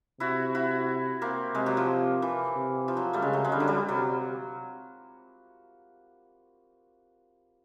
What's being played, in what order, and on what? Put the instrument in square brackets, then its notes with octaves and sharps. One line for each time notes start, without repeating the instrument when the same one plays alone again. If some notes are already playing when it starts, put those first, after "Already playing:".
[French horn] C3 [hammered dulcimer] E4 F#4
[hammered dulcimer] E4 F#4
A#3 C4
[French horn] C3 [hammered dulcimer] G#3
[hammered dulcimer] F#3
F3
E3
[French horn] C3
[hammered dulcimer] F3
F#3
G3 A3
[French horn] C#3 [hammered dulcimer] G#3
[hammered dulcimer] F#3
G#3
[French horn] D3 [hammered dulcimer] G3
[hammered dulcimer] F#3
G3
[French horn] C3 [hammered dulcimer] F#3